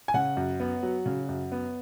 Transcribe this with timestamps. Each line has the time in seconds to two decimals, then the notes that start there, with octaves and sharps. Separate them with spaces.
0.08 G#5
0.14 C#3 F#5
0.37 F#2
0.60 B3
0.83 F#3
1.06 C#3
1.29 F#2
1.52 B3